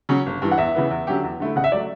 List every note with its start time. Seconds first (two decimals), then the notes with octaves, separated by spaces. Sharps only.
0.09 C#3 F#3 C#4
0.26 G1
0.42 G2 E3
0.52 F#5
0.58 E2 E5
0.75 C#3 E3 B3
0.91 E2
1.07 D3 F#3 C#4 G4
1.24 E2
1.40 D3 A3 E4
1.56 C#3 F#5
1.64 E5
1.72 F#3 A3 D5